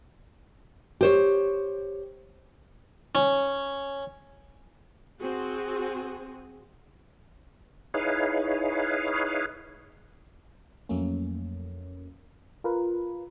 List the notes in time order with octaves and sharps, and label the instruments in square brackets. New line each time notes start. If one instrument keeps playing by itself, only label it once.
[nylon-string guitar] G4 C5 C#5
[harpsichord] C#4
[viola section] C4 F#4 G#4
[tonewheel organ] D#4 E4 G#4 B4 C#5 F5
[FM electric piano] F2 F#3 A3 A#3 C#4
F4 A#4 B4